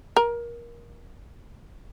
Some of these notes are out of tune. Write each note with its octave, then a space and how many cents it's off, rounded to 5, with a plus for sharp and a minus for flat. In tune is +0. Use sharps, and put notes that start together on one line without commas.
A#4 +20